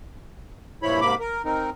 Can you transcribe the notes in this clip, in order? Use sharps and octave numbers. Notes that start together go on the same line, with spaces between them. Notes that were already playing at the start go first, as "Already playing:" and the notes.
G2 A#2 F3 E4 C#5 B5
G#2 C3 A#3 B5 D6
A#4
C4 D#4 A#4